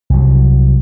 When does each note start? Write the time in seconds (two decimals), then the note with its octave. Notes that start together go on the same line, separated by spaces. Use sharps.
0.10 C2 F#3